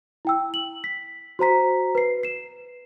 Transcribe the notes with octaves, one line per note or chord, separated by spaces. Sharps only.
E4 G5 E6
F#7
B6
F#4 C5 A#5 B6
B4 C7
C7 E7